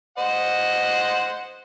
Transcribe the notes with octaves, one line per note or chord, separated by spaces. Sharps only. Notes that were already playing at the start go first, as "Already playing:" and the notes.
C5 D#5 F#5